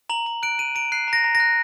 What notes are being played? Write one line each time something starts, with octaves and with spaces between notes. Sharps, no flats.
A#5 F#7
A#5
F#6 D7
A#5 D#7
A#5 D7
F#6 C7
A#5
A#6
A#5
A#6
F#6